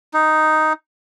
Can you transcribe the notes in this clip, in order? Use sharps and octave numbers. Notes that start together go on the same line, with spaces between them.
D#4